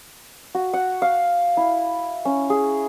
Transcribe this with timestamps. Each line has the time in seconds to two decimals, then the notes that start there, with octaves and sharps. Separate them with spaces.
0.55 F#4
0.73 F#5
1.02 F5
1.57 E4
2.25 C#4
2.50 G#4